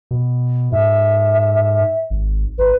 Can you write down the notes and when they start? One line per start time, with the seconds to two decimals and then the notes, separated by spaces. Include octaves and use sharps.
0.11 B2
0.72 G#2 E5
2.10 G#1
2.58 G#1 B4